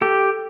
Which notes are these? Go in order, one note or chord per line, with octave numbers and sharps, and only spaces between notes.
G4 A4